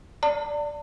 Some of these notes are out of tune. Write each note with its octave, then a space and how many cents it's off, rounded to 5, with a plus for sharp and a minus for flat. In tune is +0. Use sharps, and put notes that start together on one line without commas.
D5 +0 A5 +45